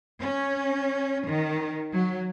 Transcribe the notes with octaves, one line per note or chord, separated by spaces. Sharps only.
C#4
D#3
F#3